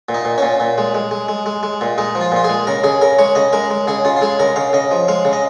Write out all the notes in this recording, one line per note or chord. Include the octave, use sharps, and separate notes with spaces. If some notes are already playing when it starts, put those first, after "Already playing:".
A#2
D#4
A#2
A#2 C#4
A#2
G#3
G#3
G#3
G#3
G#3
G#3
A#2
G#3 D#4
F3
F4
A#2 F4
G#3 G#4
C#3 A#4
C#3 G#4
C#3 A#4
G#3 C#5
C#3 D#5
G#3 A#4
G#3
C#3 G#4
C#3 F4
F4
G#3 G#4
C#3 A#4
C#3 F5
C#3 D#5
F3
G#3 F5
C#3
D#5